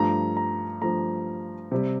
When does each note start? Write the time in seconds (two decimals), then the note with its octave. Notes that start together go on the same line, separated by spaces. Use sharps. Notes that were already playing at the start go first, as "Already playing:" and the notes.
Already playing: G2 F3 A3 A#5
0.37 A#5
0.81 G2 F3 A3 A#5
1.72 C3 G3